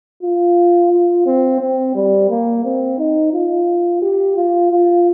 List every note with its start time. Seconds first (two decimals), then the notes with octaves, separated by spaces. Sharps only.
0.23 F4
0.92 F4
1.26 C4
1.60 C4
1.95 G3
2.30 A#3
2.65 C4
2.99 D#4
3.33 F4
4.02 G4
4.37 F4
4.71 F4